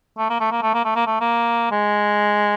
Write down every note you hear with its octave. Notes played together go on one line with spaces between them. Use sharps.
A3
A#3
A3
A#3
A3
A#3
A3
A#3
A3
A#3
G#3